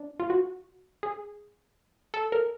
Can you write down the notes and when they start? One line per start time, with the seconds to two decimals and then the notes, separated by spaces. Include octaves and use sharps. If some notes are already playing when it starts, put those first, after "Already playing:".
Already playing: D4
0.20 F4
0.30 F#4
1.03 G#4
2.14 A4
2.32 A#4